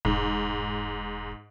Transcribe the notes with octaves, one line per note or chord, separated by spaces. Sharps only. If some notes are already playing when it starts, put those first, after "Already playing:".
E1 G#2